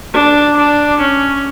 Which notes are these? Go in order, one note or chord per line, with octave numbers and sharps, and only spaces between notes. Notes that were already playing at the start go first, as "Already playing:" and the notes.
D4
D4
C#4